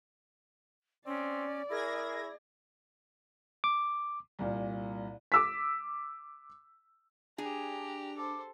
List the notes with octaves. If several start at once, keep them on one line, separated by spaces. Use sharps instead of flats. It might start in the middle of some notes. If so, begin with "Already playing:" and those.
C4 C#4 D5
E4 G#4 A#4 G#6 A#6
D6
C2 A#2
D6 E6 B6
D4 G4 G#4 A#5
A4 C5 D6